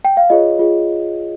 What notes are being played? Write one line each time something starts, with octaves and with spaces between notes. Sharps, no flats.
G5
F5
F4 G#4 C#5 D#5
F4 G#4